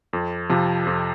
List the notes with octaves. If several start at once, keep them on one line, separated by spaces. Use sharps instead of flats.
F2
C3 F3
F2